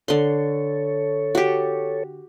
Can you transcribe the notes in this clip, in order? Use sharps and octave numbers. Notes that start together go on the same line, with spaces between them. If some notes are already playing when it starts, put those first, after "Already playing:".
D3 A4 C#5 C6
F#4 G4